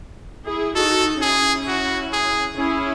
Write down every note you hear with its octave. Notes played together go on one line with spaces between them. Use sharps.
E4 G#4
D#4 F#4 A4
C#4 E4 G#4
F#4
G#4
C#4 E4 G#4